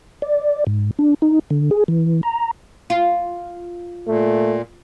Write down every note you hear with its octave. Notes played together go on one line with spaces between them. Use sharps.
D5
G#2
D4
D#4
D3
G#4
E3
A#5
F4
A#2 A3